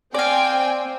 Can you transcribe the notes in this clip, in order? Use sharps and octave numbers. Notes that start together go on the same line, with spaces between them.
C4 D5 F5 G5 G#5